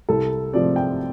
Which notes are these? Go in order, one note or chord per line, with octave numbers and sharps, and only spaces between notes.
C2 A4
C3 F3 D5
G5